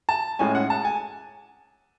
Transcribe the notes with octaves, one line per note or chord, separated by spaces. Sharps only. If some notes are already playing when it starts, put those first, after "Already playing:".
A5
A2 G#3 C#4 G#5
F#5
A5
G#5